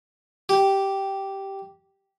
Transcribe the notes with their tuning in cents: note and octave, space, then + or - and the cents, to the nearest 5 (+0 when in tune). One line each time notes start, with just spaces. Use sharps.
G4 -5